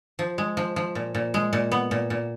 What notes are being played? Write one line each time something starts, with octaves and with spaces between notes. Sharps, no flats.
F3
G#3
F3
F3
A#2
A#2
G#3
A#2
B3
A#2
A#2